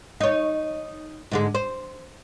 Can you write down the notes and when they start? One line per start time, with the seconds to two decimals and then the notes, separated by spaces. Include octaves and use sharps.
0.21 D#4 C#5
1.31 G#2 D3 G#3
1.55 C5